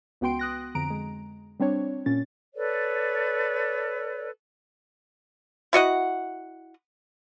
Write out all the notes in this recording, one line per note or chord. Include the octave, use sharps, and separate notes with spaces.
C#2 B3 F#4 G5 C6 D7
D#6 F#6 A#6
F2 D3 A#5 D7
G#3
G3 C4 D4 C#5
A#2 C#4 A6
A4 B4 C#5 D5
E4 F#4 D#5 F#5